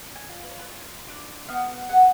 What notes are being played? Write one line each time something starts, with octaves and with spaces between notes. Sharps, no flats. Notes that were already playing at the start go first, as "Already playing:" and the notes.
Already playing: D4
G#5
F4
B4
C#5
B4
F4 C#5
D4 D5
B3 F5
G#4 F#5